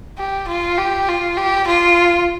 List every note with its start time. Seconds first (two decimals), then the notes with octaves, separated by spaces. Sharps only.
0.19 G4
0.48 F4
0.78 G4
1.08 F4
1.37 G4
1.68 F4